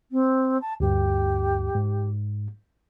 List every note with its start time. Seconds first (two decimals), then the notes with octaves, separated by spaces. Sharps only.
0.11 C4
0.60 A5
0.80 D2 G2 G4
1.75 G#2